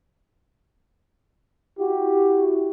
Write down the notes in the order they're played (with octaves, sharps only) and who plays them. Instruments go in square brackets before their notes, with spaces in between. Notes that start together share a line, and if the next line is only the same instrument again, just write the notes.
[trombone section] E4 F#4 G4